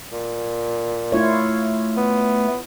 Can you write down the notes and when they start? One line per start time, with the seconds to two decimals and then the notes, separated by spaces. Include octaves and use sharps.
0.13 A#2
1.12 A3 E4 F4 C#5
1.97 B3